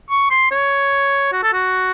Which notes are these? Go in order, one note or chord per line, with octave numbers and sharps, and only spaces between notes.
C#6
C6
C#5
F#4
A4
F#4